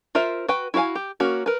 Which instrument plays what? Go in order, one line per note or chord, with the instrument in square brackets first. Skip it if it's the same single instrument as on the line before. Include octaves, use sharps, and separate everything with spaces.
[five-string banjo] F4 A#4 C5 E5
F#4 B4 G5
E4 F#4 G#4 F5 G#5
G4
A#3 C#4 F#4
A#4 B4